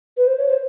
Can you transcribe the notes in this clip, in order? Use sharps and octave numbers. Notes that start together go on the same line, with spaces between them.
B4
C5
C#5
C5